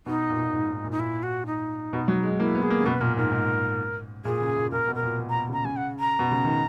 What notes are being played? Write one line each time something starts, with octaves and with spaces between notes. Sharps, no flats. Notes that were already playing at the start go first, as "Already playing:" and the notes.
B2 D#4
A#2
A#2
G#2
G#2
A#2
D#4
A#2 E4
F#4
D#4
B2
F#3
G#3
A#3 E4
B3
G#4
A#3
C#3
B2 B4
A#2 A#4
G#2 A#4
G#2
A#2 G#4
C#3
A#2
A#2 A#4
B2
A#4
A#2
B2
B2 A#5
C#3
A#5
C#3 G#5
F#5
A#5
B2
C#3
D#3